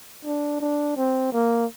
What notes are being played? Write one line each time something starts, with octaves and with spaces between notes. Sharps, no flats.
D4
D4
C4
A#3